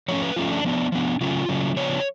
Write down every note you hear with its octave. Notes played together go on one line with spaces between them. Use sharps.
F3 A3 C#4 C#5
B4
F3 A3 C#4 F4
D4
F3 B3 D4
F3 B3 D4
C#3 F#3 A3 C#4 F4
C#3 F#3 A3 C#4
C#3 F3 B3 D4 C#5